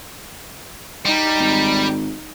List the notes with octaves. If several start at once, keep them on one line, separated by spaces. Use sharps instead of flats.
G3 D#4
G#1